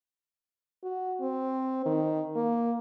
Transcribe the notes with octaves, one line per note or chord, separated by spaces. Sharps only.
F#4
C4
D#3
A#3